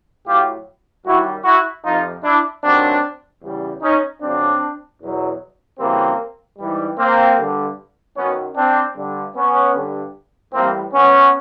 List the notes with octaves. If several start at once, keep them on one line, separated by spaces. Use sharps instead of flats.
A2 F#3 F4 G4
F#2 D#3 G3 E4 F#4
E4 F#4
F2 C3 F3 D#4 F4
D4 E4
G2 D#3 F#3 C4 D4
E2 C#3 E3 G3
C#4 D#4
F2 C#3 F#3 C4 D4
E2 B2 F#3
F#2 C#3 E3 G3 A#3 C4
G#2 E3 G3
A#3 C4
G2 D3 G3
F#2 D#3 F#3 B3 C#4
C4 D4
G2 D3 G3
B3 C#4
G2 D3 G3
A2 E3 G3 A#3 C4
B3 C#4